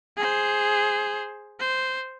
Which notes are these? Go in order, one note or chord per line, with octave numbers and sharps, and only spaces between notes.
G#4 C5
C5